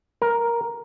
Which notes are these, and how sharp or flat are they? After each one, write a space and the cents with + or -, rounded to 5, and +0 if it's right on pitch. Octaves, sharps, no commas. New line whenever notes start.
A#4 +5